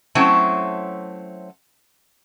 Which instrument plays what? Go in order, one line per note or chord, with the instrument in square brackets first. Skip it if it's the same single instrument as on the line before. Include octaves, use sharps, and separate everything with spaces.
[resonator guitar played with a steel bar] F#3 A3 C4 C#4 E4